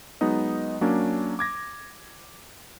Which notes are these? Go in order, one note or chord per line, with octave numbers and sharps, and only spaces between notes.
F#3 G#3 B3 D#4 D#5
F#3 A#3 C#4 D4
D6 G#6 A#6